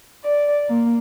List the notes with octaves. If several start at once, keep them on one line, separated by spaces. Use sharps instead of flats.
D5
A#3